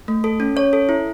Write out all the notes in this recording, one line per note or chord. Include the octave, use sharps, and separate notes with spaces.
A3
A4
C#4
C#4 C#5
A4
E4